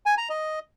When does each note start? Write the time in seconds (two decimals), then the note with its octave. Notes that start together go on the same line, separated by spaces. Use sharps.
0.06 G#5
0.18 A#5
0.29 D#5